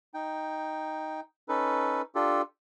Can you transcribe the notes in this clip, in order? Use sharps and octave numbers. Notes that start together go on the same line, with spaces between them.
D#4 G5
C#4 D#4 A4 B4
D4 F4 G4 A4